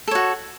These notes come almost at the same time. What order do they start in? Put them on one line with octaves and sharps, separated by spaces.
A4 C#5 F#4